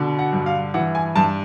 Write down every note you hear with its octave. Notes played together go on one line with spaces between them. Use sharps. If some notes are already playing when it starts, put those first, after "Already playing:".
Already playing: B2 D3
F#5
G2
F5
E3 F#5
G#5
G2 A5